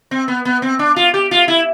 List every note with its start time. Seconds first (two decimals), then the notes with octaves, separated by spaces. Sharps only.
0.11 C4
0.28 B3
0.45 B3
0.62 C4
0.79 D4
0.96 F4
1.14 G4
1.31 F4
1.48 E4